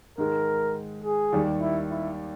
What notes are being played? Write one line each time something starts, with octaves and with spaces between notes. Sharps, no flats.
G#2 D#3 G#3 A#4
G#4
D#2 D#3 G3
E4
E4